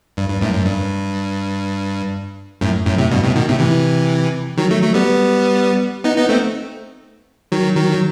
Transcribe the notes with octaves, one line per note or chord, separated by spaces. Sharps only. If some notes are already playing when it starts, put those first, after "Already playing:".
G2
G2
F#2 A2
F#2
G2
F#2 A2
F#2 A2
A2 C3
G2 B2
A2 C3
B2 D#3
A2 C3
C3 E3
D#3 F#3
F#3 A3
F#3 A3
G3 B3
B3 D#4
B3 D#4
A3 C4
D#3 F#3
D#3 F#3
F#3